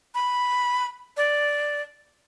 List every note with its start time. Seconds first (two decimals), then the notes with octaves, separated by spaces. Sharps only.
0.15 B5
1.17 D5